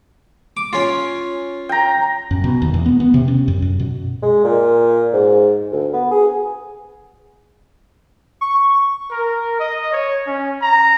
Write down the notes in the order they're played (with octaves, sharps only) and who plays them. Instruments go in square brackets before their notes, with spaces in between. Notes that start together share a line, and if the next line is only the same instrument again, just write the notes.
[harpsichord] D6
C#4 F4
[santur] G5 A#5
[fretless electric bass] F#2
B2
D#2
E2
B3
B3
C3
C#4
F#2
F#2
B2
[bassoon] G#3
A#2
G#2
D2
B3
G#4
[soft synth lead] C#6
[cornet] A#4
D#5
C#5
C#4
A#5